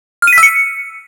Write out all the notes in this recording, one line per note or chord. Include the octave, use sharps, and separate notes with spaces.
F6
D#7
B6
E6
C#7